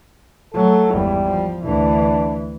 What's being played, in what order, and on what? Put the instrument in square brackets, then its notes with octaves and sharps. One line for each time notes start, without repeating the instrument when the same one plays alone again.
[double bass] F#3 A3 [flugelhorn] A4
[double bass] G#1 E2 [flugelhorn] G3
[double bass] F3
[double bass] D2 E3 [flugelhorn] D4